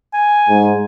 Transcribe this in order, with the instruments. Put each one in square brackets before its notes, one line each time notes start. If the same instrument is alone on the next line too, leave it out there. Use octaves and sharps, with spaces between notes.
[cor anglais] G#5
[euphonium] G#2